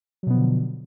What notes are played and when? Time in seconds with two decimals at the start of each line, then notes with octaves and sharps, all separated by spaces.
0.23 F#3
0.27 B2
0.30 B3
0.34 F3
0.38 D3